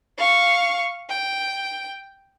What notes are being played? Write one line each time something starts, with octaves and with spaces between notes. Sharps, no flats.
F5 C#6
G5